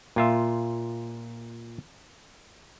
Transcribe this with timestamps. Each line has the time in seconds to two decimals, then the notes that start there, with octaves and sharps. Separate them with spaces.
0.16 A#2 F4 E5